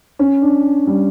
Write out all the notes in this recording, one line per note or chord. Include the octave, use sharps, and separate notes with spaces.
C#4
D4
G3